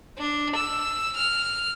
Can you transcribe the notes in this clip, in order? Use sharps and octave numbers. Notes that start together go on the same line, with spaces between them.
D4
E6
F6